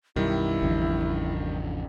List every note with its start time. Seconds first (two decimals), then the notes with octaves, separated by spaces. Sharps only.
0.16 B1 F#2 D#3 G3 E4
0.62 G#1 E2 C#3 F3 D4